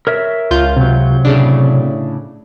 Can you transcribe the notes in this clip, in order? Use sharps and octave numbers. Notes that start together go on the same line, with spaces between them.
A#4 C#5 E5
C#2 F4 G6
C3 F#3
A2 C#3 D4